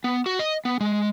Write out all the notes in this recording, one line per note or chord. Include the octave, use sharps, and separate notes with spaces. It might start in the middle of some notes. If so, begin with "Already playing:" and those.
B3
F#4
D#5
B3
G#3